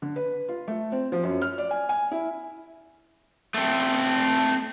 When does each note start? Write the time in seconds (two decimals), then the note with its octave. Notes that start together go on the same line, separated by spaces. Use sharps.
0.02 D3
0.16 B4
0.49 F4
0.68 A3
0.92 C4
1.12 F3
1.24 F#2
1.42 F6
1.58 D5
1.71 G#5
1.89 G#5
2.11 E4
3.54 A3 C4